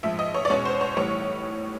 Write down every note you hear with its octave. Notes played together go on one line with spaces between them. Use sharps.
A#1 G#2 F3 E5
D#5
C#5
D5
E2 B2 G#3 C#4 C#5
C5
C#5
B1 A2 E3 G3 C#5